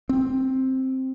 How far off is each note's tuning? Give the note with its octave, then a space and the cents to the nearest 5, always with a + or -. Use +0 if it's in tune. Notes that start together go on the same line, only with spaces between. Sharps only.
C4 +5